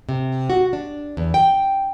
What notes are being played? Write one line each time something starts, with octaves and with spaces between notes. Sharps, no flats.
C3
F#4
D4
E2
G5